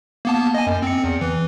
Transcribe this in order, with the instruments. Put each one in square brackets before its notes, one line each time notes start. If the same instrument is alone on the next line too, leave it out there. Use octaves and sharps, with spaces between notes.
[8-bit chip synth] A#3 B3 A5
D#5 G#5
F#2
C4 C#7
E2
E3